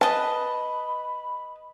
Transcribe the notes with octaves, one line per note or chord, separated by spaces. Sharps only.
B4 D#5 A5 B5